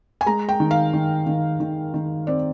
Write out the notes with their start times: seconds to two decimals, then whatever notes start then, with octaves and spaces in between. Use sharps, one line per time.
0.21 G#5
0.26 G#3 A#5
0.49 G5
0.60 D#3
0.71 F5
0.93 D#3
1.27 D#3
1.60 D#3
1.94 D#3
2.27 C4 D5